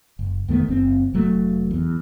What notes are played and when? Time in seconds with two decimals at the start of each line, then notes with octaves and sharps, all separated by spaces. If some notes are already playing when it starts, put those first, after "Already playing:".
0.19 F#1
0.48 E2 D#3 A3 B3
0.68 F#1 C4
1.14 F1 F#3 A3
1.71 E2